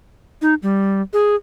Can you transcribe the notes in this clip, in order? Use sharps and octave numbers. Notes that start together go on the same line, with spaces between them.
D#4
G3
G#4